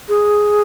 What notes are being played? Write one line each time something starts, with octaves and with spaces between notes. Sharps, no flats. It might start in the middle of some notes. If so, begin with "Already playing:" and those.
G#4